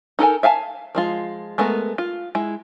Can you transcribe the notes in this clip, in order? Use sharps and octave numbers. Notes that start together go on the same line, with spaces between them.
D#4 A4 A#4 G#5
E5 F5 G#5 A5
F3 G#3 F4
G#3 A3 B3 A#4
F4
G#3 E4